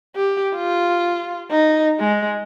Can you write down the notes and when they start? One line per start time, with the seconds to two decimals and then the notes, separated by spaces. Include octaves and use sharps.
0.16 G4
0.55 F4
1.51 D#4
2.00 G#3